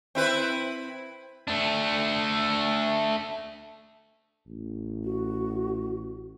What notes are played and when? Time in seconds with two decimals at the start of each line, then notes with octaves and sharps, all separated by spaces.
0.15 C4 E4 B4
1.48 A3 D4
4.48 A1
5.04 F#4